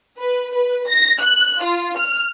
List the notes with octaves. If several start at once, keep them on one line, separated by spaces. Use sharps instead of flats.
B4
B4
A#6
F#6
F4
F6